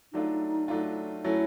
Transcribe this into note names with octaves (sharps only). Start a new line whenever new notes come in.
F#3 A3 D4 D#4 F4
F#3 A3 D4 F4
F#3 A3 C#4 E4